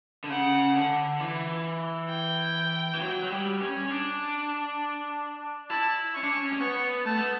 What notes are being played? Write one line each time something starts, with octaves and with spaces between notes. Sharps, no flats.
D3
C#3 F#5
D3
E3
G5
E3
F#3
F#3
G3
C#4
C#4
D4
E4 A5
C#4 C#6
D4
C#4
C#4
B3 C#6
A3 A5
B3